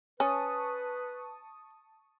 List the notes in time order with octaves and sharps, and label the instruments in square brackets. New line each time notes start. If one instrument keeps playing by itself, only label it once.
[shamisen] C#4 [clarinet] B4 [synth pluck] A5 C#6 D#6